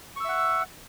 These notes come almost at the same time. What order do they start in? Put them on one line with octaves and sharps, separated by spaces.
C#6 E6 E5 F#5